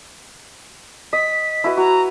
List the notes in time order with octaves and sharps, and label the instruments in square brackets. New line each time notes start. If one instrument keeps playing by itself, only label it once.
[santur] D#5 [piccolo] B6
[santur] E4 F#4 B4
[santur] F#4 [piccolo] A#5